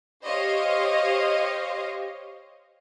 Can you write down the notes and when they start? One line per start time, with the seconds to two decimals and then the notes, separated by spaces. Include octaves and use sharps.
0.24 G4 C5 C#5 D#5 F5